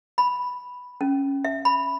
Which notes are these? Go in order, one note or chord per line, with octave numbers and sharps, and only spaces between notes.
B5
C#4
E5
B5